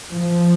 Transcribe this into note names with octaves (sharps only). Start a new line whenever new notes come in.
F3